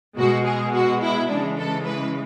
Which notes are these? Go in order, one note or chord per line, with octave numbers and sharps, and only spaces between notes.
B2 G#3 F#4
G#4
F#4
E4
C#3 E3 G#3 D4
A4
B4